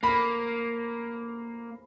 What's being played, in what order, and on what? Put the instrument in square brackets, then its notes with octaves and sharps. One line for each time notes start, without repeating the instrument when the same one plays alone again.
[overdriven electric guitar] A#3 [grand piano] B5